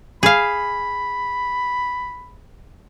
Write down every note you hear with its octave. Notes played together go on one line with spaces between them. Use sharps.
G#4 F5 B5